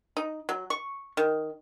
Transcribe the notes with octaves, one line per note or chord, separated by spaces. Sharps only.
D#4
F#3
C#6
D#3